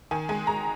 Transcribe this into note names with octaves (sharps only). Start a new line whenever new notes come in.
D#3 G#5
G#3 G#5
G#3 A#5